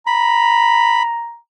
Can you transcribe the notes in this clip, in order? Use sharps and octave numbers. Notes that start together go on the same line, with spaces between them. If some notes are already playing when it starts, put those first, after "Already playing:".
A#5 B5